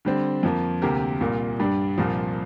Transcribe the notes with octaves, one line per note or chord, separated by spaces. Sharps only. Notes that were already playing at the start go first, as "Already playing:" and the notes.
D3 G3 C4
F2 F3 A#3
D2 C3 A#3 G4 A#4
C2 A#2 A#3
G2 G3 D4
C2 A#2 F3